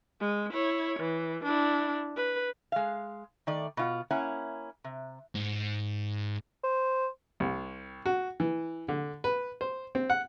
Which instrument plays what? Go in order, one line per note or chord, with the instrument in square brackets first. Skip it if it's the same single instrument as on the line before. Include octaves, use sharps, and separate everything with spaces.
[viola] G#3
E4 C#5
E3
D4 E4
B4
[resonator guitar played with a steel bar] G#3 F5
D#3 A3 D5
B2 F4 F#5
A#3 C#4 E4 F#5
C3
[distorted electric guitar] G#2
[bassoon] C5
[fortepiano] C2
F#4
E3
D3
B4
C5
C4
F#5